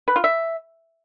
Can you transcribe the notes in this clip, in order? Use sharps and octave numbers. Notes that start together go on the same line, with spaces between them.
B4
F4
E5